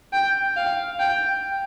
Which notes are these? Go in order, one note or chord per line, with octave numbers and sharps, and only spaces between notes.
G5
F5
G5